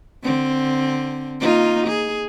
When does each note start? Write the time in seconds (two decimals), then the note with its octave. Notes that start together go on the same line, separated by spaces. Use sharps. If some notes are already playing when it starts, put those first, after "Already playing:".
0.23 D3 C4
1.40 A#3 D#4 F4
1.87 G#4